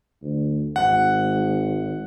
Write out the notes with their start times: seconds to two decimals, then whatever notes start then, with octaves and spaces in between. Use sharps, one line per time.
0.22 D2
0.76 G#1 F#5